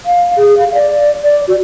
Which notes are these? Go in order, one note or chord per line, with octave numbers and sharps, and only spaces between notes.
F5
G#4
F5
D5
D5
F#4